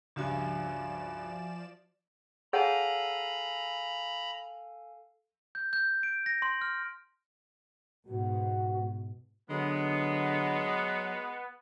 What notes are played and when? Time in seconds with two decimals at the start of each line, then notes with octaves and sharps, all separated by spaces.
0.16 C#2 G2 F3 F#4 D5 E5 G#5 E7
2.53 G#4 A4 C#5 F5 F#5 G#5 A#5 B5
5.55 G6
5.73 G6
6.03 D7
6.26 A#6
6.42 C6
6.61 F6
8.08 G#2 B2 F#4
9.50 D3 F#3 G#3 B3